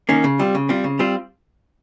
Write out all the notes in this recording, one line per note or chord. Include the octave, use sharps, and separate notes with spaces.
D#3 A#3 C#4
C#3
G3 C4 F4
C#3
G3 C4 F4
C#3
G3 C4 F4